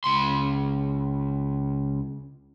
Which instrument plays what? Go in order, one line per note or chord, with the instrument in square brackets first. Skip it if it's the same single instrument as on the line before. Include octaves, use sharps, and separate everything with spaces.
[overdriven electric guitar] C#2 C6